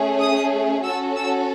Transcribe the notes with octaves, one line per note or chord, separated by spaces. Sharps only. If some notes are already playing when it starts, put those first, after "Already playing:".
Already playing: A3 C#4 G#4
D#6
C#4 F#4 A4 E6
E6